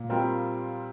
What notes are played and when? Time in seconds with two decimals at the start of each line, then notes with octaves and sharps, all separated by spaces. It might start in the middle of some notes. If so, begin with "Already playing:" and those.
Already playing: A#2
0.10 G3 C4 F4 A#4